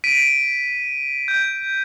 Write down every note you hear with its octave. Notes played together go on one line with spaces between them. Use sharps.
B6 D7 D#7
G6